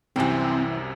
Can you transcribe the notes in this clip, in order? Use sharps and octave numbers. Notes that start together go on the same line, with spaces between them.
C2 F#2 C3 E3 C4 G5